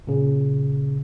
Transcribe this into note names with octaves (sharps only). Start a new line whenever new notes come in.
A#2 C#3